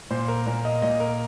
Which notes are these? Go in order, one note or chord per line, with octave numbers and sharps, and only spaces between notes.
A#2 C5
A#4
A#2 A#4
D#5
A#2 D#5
A#4